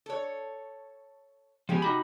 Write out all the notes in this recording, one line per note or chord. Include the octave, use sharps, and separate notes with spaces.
A4 C#5
F3 G#3 B3 G4 G#4
C3 D#4 F#4 B5